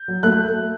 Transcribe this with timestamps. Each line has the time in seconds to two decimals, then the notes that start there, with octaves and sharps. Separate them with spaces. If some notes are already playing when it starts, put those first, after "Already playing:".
Already playing: G6
0.08 F#3
0.23 A3 F#6